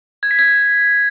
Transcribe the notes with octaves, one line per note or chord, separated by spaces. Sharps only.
G#6
B6
G#6